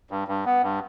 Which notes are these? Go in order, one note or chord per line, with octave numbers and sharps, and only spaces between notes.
G2
G2
B3
G2